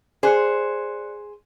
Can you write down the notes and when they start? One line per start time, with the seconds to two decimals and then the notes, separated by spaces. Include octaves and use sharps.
0.23 G#4 C5 D5 F#6 C#7